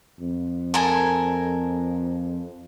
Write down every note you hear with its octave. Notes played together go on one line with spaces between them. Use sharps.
F2
A4 A#4 G#5